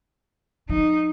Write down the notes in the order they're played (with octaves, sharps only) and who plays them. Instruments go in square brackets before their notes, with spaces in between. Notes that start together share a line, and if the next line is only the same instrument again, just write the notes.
[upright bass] F3 [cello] D#4